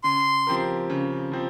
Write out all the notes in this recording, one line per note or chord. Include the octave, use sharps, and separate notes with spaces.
C#3 C6
F3 C4 G4 A#4
C#3
F3 C4